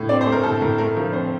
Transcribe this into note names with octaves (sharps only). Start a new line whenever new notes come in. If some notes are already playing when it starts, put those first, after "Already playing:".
Already playing: A2
C4 D5
C5
A3
A#4
A2 A4
A2 A#4
A3 A#4
F3 A#4
C4 C5